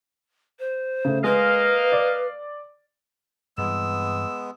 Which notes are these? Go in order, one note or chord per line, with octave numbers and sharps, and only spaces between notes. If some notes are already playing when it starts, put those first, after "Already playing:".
C5
C#3 A3
G#3 A#3 B4 D#5 F5
D5
G2 E3 G#3 B3 E6